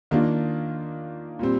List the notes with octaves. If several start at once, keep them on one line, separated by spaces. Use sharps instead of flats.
D#3 A#3 D4 F4
A#2 G3 C4